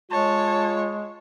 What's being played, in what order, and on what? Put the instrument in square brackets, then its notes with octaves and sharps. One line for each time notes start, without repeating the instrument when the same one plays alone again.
[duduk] G#3 [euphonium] F4 [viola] C#5 [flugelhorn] A5